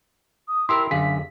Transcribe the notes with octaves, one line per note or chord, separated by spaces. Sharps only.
D#6
E4 G4 A#4 C6 E6
F#2 D3 G#4 F5 B6